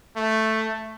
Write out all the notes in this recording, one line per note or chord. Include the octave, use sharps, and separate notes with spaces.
A3